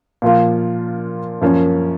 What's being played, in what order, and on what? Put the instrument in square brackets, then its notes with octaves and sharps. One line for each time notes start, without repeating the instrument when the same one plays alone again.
[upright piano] A#2 F3 A#3 F4
F#2 F3 A#3 C#4